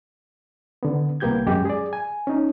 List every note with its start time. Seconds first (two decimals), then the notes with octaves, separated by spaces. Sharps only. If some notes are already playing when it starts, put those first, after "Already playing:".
0.83 D3 B3
1.20 C2 A#3 B3 G4 G6 G#6
1.47 F#2 G#3 F#4 G4
1.65 G#4 D5
1.93 G#5
2.27 C#4 D#4